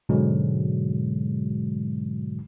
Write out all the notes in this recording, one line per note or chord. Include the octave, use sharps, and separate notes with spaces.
G#2 B2 D3 F#3 G#3